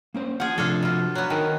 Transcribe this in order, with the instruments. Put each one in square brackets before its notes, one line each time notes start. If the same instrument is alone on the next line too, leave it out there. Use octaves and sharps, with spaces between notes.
[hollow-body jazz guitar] A#3 C#4 C5
[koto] F3 G#4 [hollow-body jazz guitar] F#5
[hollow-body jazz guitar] C3 F3 [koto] D4 F4 A4
[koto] B2 F4
F#3 B3
[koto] D#3 [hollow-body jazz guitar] A#4 G#5 A5